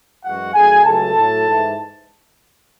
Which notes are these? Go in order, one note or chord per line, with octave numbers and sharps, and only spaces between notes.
F#2 E3 G#3 F#4 F#5
F#2 D#3 A3 G#4 G#5
C#2 C#3 F#3 A3 A4 A5
A2 F#3 A3
G#2 E3 G#3